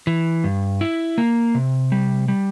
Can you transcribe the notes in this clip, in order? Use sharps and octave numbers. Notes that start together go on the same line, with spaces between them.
E3
G2
E4
A#3
C3
G3
G3